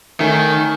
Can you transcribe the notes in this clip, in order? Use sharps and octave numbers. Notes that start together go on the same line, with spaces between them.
D#3 A3 C#4